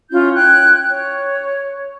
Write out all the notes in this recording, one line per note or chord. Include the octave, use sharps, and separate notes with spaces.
C#4 E4 F4 G6
G5 F#6 G#6
C#5